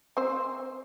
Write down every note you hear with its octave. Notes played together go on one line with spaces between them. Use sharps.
C4 C5